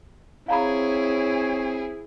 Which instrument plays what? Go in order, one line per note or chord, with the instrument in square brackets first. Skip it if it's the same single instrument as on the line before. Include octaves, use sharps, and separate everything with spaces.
[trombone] C4 [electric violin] E4 G#4 [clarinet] C#5 [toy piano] F5 A#5 B5